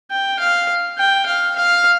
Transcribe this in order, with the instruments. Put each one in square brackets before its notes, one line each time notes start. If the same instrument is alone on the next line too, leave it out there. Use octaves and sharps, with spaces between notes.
[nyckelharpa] G5
F5
G5
F5
F5